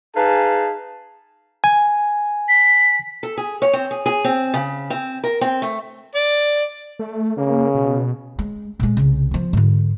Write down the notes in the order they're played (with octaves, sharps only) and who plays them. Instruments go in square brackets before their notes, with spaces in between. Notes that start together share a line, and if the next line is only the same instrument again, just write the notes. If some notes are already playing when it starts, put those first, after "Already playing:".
[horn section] D#4 G#4 B4 F5 G#5 A5
[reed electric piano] G#5
[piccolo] B6
[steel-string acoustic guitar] A4
G#4
C#5
C4
G#4
G#4
C4
C#3
C4
A#4
C4
A3
[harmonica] D5
[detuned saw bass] A3
[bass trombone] C#3 [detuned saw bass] A#3
[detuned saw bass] B2
[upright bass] G#3
A#2 G#3
C2 C#3
F3 B3
G#2 D3